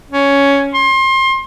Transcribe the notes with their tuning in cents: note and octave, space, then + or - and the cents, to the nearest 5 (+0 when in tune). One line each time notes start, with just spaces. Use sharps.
C#4 +10
C6 +30